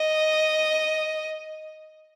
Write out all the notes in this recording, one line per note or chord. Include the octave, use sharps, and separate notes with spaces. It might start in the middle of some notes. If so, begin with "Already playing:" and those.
Already playing: D#5